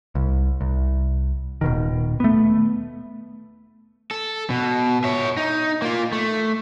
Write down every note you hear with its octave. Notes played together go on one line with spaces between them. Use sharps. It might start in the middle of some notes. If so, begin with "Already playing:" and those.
C2
C2
D#1 B2 D#3
A3 B3
A4
B2
C#5 E5
D#4
A#3 F4
A3